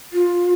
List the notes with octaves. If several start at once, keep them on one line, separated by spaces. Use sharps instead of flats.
F4